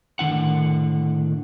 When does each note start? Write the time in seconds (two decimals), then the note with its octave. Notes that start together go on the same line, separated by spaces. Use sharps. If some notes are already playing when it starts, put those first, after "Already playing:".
0.19 A2 D3 D#3 D#4 F#5